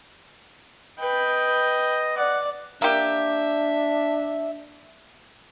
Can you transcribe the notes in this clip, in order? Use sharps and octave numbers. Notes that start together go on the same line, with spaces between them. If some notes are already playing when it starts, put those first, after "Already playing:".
B4 D#5 G5
D5 F#5
A#3 D4 G4 E5